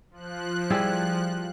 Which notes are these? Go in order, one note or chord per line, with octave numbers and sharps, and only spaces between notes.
F3 F#6
G3 E4 G#4